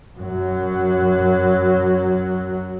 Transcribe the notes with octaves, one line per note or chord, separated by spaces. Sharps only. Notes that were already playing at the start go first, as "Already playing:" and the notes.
F#2 F#3